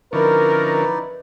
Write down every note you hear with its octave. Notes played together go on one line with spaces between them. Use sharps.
D3 F3 C#4 D#4 E4 A#4 B4 D5